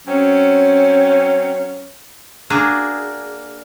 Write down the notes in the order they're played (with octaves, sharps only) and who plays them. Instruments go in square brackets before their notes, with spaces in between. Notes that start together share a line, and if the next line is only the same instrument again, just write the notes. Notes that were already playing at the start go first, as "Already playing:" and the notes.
[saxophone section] F#3 C4 C#4
[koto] A#3 D4 F#4 G#4